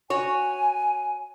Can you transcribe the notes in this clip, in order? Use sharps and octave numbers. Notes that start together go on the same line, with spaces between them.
F#4 C#5 G#5